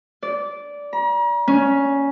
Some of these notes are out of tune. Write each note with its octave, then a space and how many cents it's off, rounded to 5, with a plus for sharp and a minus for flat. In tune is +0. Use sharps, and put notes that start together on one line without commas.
D5 -15
A#5 +40
C#4 +5